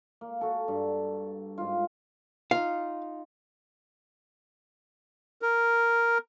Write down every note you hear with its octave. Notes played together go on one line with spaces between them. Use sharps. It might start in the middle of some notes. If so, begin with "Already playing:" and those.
A#3
F#4 A4
G2
G#2 F4
D#4 F4 F5
A#4